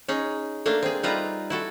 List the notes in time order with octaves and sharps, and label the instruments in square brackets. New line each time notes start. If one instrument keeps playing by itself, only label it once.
[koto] C#4 D#4 G#4
A3 A#3 D4
C4 G#4
G3 D#4 F4 B4 E5 A#5
E4 F#4 A4